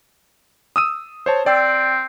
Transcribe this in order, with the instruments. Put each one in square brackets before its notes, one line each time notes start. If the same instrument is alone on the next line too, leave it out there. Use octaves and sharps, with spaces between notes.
[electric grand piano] D#6 E6 D#7
C5 C#5 A5
[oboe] C4 [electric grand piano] D5 G5 E6